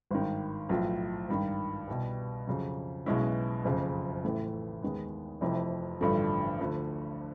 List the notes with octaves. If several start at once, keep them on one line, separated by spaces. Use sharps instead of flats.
G#1 G2 D#3
B1 A2 F3
G#1 G2 D#3
C2 B2 G3
F2 C#3 F#3
B1 B2 G#3 C#4 E4
F#1 F2 C#3
A1 A2 E3 A3
D#2 D#3 G#3 B3
F1 F2 C3 E3
A1 G2 D3 F3 A3
D2 D3 F3